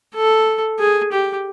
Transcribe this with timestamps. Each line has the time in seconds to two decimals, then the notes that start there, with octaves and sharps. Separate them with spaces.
0.15 A4
0.79 G#4
1.12 G4